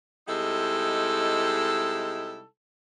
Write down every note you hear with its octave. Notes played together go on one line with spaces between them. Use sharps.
C3 G3 G#3 D#4 E4 A4